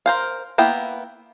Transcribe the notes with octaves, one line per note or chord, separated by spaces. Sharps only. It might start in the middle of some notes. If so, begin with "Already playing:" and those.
A#4 C5 F5
A#3 B3 E4 G5